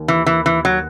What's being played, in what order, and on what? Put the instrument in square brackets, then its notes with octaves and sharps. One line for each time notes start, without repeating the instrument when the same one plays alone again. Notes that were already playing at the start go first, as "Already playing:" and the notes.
Already playing: [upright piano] D#2
[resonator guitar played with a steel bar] E3
E3
E3
F#3